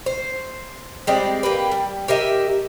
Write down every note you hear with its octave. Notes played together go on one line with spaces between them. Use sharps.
C5
G3 G#3 C4 D5
A#3 G4 B4
G3
G4 A#4 D#5 E5